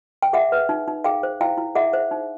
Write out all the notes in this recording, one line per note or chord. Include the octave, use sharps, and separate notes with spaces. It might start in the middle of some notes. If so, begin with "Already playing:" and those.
G5
G#4 E5 F#5
B4
D#4
D#4
G#4 F5 G5
C5
E4 F5 G5
E4
G#4 E5 F#5
C5
D#4